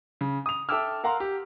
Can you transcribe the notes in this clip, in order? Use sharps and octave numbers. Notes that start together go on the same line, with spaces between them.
C#3
D#6 F7
A4 E5 G5 D6 E6 F6
A#4 F5 F#5 A#5 C6
G4